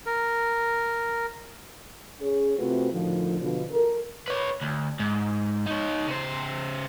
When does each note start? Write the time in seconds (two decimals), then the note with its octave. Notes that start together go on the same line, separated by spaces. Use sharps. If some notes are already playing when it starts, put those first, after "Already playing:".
0.06 A#4
2.20 C#4 G#4 C#5
2.58 C3 A3 C4 F4 F#4 B4
2.93 A2 D3 D#3 F3
3.40 B2 D3 F3
3.71 A4 A#4
4.28 B4 C#5
4.61 D2
5.00 G#2
5.66 D#4 C#5
6.07 C#3 C5